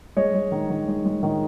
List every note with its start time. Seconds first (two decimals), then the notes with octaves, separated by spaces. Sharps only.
0.16 G#3 C#5 D#5
0.34 G#3
0.52 D#3
0.70 D#3
0.88 G#3
1.05 G#3
1.23 D#3